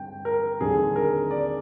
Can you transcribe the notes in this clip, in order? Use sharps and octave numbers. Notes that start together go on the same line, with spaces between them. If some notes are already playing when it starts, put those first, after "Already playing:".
Already playing: G2 D3 C4 G5
A#4
D#2 D3 G3 C4 G#4
A#4
D5